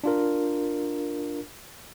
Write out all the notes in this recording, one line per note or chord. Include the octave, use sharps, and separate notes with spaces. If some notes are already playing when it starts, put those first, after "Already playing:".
D4 F4 A#4